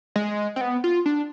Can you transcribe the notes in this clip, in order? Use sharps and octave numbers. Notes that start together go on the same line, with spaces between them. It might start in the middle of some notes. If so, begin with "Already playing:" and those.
G#3
C4
B3
F4
D4